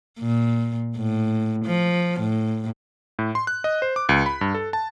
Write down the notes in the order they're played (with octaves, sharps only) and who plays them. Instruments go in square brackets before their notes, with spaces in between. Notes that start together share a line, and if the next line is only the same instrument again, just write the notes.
[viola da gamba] A#2
A2
F3
A2
[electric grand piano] A2
C6
F#6
D#5
C5
D6
C#2
B5
G2
A4
A5